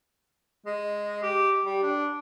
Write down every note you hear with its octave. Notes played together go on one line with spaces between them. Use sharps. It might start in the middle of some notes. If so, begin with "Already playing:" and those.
G#3
G4
G3
D4